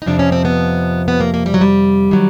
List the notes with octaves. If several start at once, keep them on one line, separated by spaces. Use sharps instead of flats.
D#4
F2 C3 F3 D4
C#4
C4
B3
B3
A#3
A#3
G3
F#3
G3
D#3 F#3